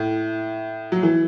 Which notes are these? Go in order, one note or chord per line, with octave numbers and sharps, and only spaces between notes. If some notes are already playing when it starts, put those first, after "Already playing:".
Already playing: A2
F#3
E3